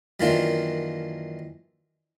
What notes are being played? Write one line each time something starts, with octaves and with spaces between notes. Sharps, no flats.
F#2 D#3 E3 A#3 D4 F4